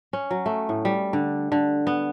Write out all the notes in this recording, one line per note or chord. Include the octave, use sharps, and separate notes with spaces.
C#4
F#3
A3
A2
G3
D3
D3
B3